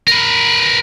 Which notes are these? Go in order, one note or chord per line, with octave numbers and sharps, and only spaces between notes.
A#4 B4